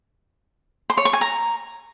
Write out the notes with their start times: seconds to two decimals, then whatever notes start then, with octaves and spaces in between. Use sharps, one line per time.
0.90 C6
0.97 C#5
1.05 C#6
1.13 G#5
1.21 A#5